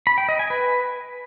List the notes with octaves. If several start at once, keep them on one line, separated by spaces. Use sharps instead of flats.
B5
G5
D#5
G#5
B4